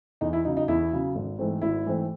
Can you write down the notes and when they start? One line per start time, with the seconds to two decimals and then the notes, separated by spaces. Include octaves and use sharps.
0.21 E2 D#4
0.33 E4
0.45 C#3 F#3 D#4
0.57 D#4
0.68 E2 E4
0.92 C#3 F#3
1.15 G#1
1.39 G#2 E3 A3 C4
1.62 G#1 E4
1.85 G#2 E3 A3 C4